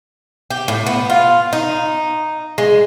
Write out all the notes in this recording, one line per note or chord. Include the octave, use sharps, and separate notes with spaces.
G4
A2
B3
F4
D#4
G#3